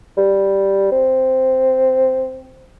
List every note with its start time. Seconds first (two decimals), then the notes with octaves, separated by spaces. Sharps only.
0.17 G3
0.92 C4